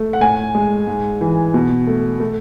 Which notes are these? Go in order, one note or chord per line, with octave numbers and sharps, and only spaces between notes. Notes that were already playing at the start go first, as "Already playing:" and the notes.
Already playing: A3
F#5
A2 G#5
G#3
G#2
E3
B2
A3
A3